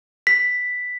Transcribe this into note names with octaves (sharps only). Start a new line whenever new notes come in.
B6